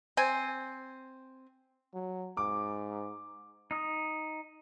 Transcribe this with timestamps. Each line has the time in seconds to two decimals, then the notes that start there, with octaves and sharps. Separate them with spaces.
0.17 C4 G#5
1.94 F#3
2.37 G#2 D6
3.71 D#4 D#6